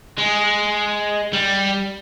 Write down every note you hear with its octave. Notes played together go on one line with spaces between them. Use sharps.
G#3
G3